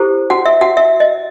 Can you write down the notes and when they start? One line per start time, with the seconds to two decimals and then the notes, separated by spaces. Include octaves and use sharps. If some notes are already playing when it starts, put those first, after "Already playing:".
Already playing: E4 G4 A4 C5
0.30 F#4 F#5
0.46 E5
0.61 F#4 F#5
0.77 E5
1.00 D#5